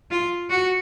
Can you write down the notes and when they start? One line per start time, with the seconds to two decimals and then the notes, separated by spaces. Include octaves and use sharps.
0.11 F4
0.50 F#4